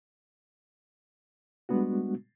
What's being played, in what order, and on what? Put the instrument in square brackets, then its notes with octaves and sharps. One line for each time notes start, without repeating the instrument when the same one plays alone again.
[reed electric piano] G3 G#3 B3 D4 F#4